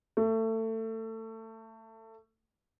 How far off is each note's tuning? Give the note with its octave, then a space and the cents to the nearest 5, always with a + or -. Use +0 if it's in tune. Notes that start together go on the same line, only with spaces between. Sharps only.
A3 +25